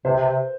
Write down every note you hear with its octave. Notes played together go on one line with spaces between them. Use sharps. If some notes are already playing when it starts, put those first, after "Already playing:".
C3 C5
C3
C3